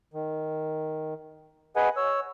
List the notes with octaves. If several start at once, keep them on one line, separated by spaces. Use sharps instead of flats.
D#3
G#4 B4 D#5 F#5 G#5
C#5 E6